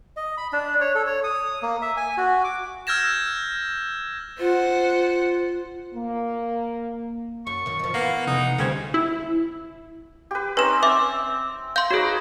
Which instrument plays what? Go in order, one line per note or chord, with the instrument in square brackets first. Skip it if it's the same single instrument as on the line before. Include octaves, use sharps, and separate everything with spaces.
[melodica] D#5
B5
D4
C#5
A4
C#5
D#6
A#3
E5
G#5
F#4
D6
[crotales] E6 F6 G6 G#6 A#6 E7
[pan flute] F4 [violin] C5 F#5
[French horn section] A#3
[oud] F#2 [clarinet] C#6
[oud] F#2 D#3
F2 F3
[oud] E3 B3 F4 [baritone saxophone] A#3 [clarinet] F#5
[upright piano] F1 [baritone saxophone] D#4
[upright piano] D2 G3 G#6 [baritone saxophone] C#3 [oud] C4 C#4 C5
[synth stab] E4
[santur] G4 B4
[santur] C4 C#4 D#4 [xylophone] B4 E7
[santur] C4 E6 [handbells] E5 [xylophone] D6
[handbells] F5 [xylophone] C6 G6
[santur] D#4 B4 C#5 [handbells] F#4 G#4